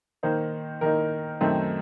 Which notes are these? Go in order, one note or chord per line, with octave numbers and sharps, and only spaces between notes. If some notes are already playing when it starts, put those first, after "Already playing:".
D#3 A#3 D#4 C5
D#3 A#3 D#4 A#4
F#2 D#3 A3 C4 D#4